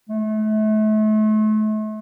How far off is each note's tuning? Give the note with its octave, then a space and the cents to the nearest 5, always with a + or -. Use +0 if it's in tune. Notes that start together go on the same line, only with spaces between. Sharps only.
A3 -35